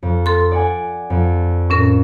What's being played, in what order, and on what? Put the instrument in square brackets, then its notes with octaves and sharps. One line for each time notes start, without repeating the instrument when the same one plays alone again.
[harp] F2
[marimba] A4 C6
[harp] D5 F#5 G#5
F2
[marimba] A2 C#4 A#4